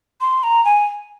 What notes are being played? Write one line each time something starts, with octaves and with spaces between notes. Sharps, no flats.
C6
A#5
G#5